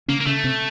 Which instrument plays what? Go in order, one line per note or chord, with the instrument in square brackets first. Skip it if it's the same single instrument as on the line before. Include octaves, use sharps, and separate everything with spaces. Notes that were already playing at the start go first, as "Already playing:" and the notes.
[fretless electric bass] C#3 C#4 [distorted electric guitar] A#3
[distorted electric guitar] A#3
[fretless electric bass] C#3 C#4 [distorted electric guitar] A3
[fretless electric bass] C3 C4